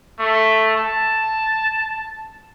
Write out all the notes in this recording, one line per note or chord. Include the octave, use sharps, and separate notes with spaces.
A3
A5